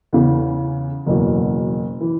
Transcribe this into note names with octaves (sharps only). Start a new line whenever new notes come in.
E2 C#3 E3
F#1 E2 B2 F#3
E3